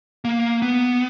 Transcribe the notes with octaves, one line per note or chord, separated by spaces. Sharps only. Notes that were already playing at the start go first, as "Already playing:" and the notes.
A#3
B3